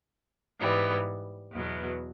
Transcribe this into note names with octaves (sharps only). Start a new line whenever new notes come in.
G#2 E3 G3 B3
E2 B2 F#3